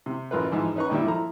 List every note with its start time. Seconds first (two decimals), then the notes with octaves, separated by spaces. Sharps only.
0.06 C3
0.31 A1 F#2 F4 A#4 B4
0.52 G#2 E3 F3 D#4
0.76 C#4 D#4 B4 A#5 C#6
0.90 G2 A#2 D#3 G3 E4
1.05 F3 E4 A4 A#5